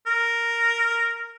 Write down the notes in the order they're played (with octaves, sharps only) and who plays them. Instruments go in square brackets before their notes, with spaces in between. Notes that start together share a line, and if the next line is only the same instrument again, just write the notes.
[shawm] A#4